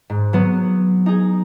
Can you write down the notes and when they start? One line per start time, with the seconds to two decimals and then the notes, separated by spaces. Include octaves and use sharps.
0.10 G#2
0.33 F#3 B3
1.06 D#4 G#4